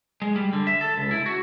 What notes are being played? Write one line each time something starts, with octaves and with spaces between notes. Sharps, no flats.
G#3
G3
D3
E5
A4
C#2
E4
F#4